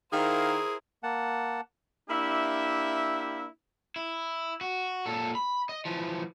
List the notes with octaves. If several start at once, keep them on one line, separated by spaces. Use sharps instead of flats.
D#3 E4 G#4 A#4 C5 F5
A#3 F#5 A5
A#3 D4 E4 G4 E5
E4
F#4
A#2 A4
B5
D#5
E3 F3